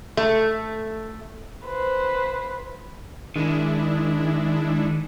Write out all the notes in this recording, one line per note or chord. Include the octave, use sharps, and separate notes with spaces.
A3
B4 C5
D#3 G#3 D4 E4